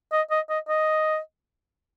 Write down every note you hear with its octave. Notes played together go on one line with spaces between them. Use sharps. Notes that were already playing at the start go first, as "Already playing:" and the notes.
D#5
D#5
D#5
D#5